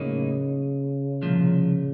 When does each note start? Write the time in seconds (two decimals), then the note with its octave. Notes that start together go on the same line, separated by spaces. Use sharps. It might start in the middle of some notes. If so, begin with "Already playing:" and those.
Already playing: A2 C#3 F#3 A#3 D#4
1.22 C2 A#2 F3